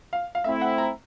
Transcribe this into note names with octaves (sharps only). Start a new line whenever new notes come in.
F5
F5
A3 C4 E4 E5
F#5
A#5